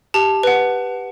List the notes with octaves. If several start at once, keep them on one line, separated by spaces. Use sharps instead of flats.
G4 A5
B4 F#5